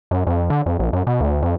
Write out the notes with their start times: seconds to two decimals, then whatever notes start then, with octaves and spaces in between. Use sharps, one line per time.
0.11 F#2
0.27 F2
0.50 D3
0.66 F2
0.79 A#1
0.93 F#2
1.07 B2
1.20 D2
1.42 F2